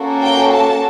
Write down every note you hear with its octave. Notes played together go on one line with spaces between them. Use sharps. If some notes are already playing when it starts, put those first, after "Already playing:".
Already playing: A#3 C#4 F#4 A4
G5
A5